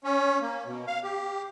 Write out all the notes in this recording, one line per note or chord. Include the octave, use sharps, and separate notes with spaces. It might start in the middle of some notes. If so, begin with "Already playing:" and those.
C#4
A#3
B2
F5
G4